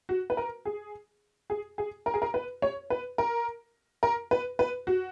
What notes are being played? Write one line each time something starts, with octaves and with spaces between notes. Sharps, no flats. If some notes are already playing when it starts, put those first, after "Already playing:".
F#4
B4
A#4
G#4
G#4
G#4
A#4
G#4
A#4
B4
C#5
B4
A#4
A#4
B4
B4
F#4